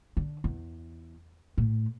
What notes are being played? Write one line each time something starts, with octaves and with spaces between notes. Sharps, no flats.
D3
E2
A2